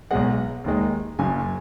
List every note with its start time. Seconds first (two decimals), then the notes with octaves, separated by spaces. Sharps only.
0.11 B1 B2 G#3 F#5
0.64 D#2 D#3 G#3
1.19 F#1 F#2 C#3 G#5